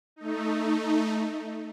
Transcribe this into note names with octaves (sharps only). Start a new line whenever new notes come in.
A3 D#4